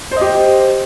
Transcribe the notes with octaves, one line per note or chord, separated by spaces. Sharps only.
G4 C5 D#5